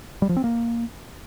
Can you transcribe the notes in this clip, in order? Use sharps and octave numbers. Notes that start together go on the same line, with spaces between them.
G3
F3
C4
A#3